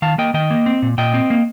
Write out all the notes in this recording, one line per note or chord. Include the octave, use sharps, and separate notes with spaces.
D#3 F5 A5
A#3 D#5 G5
D#3 D#5 G5
A#3
C4
A#2
A#2 D#5 G5
C4
A#3